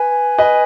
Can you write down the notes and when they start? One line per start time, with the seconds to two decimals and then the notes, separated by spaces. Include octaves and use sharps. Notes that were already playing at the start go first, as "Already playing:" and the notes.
Already playing: B4 G#5
0.38 B4 D#5